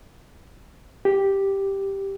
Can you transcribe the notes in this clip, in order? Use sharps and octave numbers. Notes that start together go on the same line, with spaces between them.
G4